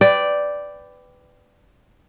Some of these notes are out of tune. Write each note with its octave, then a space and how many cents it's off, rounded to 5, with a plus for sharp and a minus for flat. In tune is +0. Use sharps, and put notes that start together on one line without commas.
B4 +20 D5 +0 G5 -5